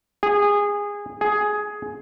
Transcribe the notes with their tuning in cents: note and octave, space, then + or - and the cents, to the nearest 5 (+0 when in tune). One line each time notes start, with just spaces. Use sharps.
G#4 -20
G#4 +10